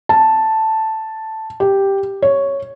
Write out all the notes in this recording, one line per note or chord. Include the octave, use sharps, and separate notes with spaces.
A5
G4
C#5